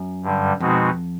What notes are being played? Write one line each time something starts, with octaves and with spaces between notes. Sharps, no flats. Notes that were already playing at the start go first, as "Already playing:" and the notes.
Already playing: F#2
G2 D3 G3
F2 B2 G#3 C4 D#4 F#4